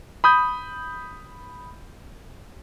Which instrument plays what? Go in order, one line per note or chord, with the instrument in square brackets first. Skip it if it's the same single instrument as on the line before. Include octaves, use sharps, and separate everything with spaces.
[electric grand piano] B5 D#6 G6